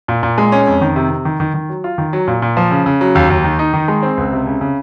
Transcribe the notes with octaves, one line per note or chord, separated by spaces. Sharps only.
A#2
A#2
G#3
C#4
F2
D#3
C3
C3
D#3
D#3
D#3
F#3
F4
D#3
F#3
A#2
A#2
F3
C#3
C#3
F#3
D#2
D#2
D#3
D#4
D#3
G#3
C4
C#2
C3
C#3
C#3